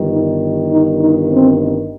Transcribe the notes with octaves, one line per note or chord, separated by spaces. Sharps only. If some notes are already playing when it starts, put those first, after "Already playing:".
Already playing: G1 G2 D#3
D#4
D#4
D#4
C4